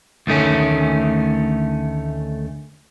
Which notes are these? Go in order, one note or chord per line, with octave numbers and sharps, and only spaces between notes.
D2 D#3 A3 C#4